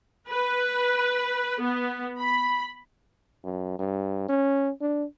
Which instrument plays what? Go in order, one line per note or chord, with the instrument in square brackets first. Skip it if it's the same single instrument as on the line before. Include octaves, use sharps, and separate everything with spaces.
[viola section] B4
B3
B5
[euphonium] F#2
G2
C#4
D4